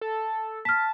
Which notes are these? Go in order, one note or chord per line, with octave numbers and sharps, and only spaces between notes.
A4
A5 F6 B6